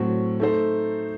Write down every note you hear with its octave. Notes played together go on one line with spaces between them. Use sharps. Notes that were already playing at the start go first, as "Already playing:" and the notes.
Already playing: A2 F#3 C4 F#4
A3 D#4 A4 C5